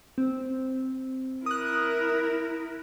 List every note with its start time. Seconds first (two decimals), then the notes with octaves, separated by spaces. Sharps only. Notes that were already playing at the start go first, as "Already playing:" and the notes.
0.18 C4
1.46 E4 A#4 D#6 F#6